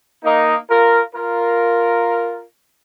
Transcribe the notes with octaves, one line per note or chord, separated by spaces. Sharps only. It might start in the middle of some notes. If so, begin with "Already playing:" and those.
A#3 D#4
F4 A#4
F4 A#4